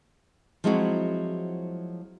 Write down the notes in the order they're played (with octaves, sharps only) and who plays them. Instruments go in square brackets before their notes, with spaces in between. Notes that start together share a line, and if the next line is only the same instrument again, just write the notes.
[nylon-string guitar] F3 F#3 G#3 C4 E4 F#4